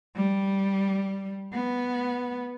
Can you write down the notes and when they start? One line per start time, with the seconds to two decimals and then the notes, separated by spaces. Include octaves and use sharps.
0.16 G3
1.53 B3